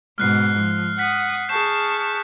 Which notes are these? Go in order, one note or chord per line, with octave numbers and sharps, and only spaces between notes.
G#2 B2 F6 F#6 C7
F3
F#5 D#6 F#6 B6
G#4 A5 C#6 G6 C7 E7